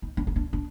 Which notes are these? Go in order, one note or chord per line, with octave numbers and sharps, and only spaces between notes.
D#4
D4
C#4
D4
D4